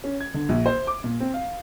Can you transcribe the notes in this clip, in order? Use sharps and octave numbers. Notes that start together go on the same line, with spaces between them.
C#4
G#6
D3
A#1
C5
D6
A#2
C4
F5